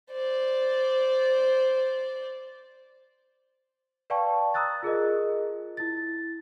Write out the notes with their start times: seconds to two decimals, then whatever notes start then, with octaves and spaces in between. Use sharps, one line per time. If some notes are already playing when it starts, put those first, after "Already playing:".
0.12 C5 D5
4.10 B4 D5 F5 G5 A5 C#6
4.54 A#5 D#6 E6 F#6 A6
4.83 F4 G#4 A#4 D#5
5.77 E4 A6